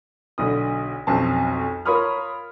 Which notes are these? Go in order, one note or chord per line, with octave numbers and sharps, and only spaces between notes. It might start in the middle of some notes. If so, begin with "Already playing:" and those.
B1 D3 D#6
B1 F2 C4 C#4 A5
F4 A#4 C#5 B5 D#6 F6